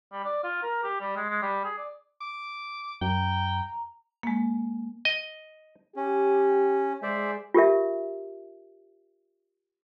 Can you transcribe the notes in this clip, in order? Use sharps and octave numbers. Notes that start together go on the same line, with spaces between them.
G3
D5
F4
A#4
G4
G3
G#3
G#3
G3
G#4
D5
D6
F#2 G5 A#5
G#3 A#3
D#5
C#4 G4
G#3 C5 D5 E5
F4 G4 A#4 E5